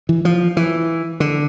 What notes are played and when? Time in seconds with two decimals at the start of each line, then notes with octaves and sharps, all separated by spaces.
0.09 E3
0.25 F3
0.57 E3
1.20 D3